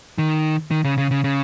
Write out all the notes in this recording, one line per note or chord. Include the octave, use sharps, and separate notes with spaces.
D#3
D#3
C#3
C#3
C#3
C#3